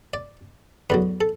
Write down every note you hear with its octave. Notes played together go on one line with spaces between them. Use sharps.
D5
E2 D3 F#3 B4
A4